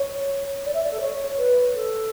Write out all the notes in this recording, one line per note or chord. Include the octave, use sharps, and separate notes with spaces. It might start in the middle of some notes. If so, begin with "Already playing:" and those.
Already playing: C#5
D5
E5
D5
A4
C#5
B4
A4